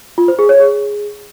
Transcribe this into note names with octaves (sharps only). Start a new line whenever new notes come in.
F4
C5
G#4
C#5
G#4